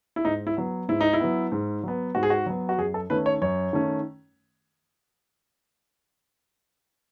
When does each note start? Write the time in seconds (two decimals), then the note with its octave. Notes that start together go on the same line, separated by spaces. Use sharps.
0.16 E4
0.25 G#2 D#4
0.47 E4
0.57 F#3 B3
0.88 G#2 E4
1.01 D#4
1.13 E4
1.20 F#3 B3
1.52 G#2
1.84 F#3 B3
2.15 G#2 F#4
2.23 G#4
2.30 F#4
2.46 F#3 B3
2.69 F#4
2.78 F#2 G#4
2.94 A4
3.10 D#3 A3 C#4 B4
3.26 C#5
3.42 F#2 C#5
3.73 D#3 A3 C#4